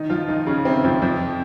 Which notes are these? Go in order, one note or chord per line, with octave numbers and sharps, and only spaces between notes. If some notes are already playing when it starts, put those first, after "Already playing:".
Already playing: D#3 D#4
F3 F4
D#3 D#4
C#3 C#4
C3 C4
F2 F3
F2 F3